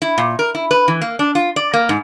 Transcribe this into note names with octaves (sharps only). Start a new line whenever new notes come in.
E4
A#2
A#4
E4
B4
E3
A#3
D4
F4
D5
A#3
G#2